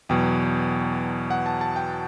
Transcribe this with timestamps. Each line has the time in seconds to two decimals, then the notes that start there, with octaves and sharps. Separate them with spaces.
0.09 E2 B2 F#3 G5
1.30 F#5
1.46 A5
1.61 A5
1.76 G5